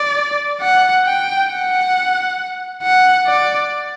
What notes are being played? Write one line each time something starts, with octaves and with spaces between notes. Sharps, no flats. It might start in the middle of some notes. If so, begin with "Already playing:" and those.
Already playing: D5
F#5
G5
F#5
F#5
D5